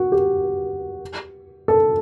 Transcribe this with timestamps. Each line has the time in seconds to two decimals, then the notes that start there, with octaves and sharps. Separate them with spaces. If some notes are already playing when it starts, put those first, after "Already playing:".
Already playing: F#4
0.12 G4
1.68 A4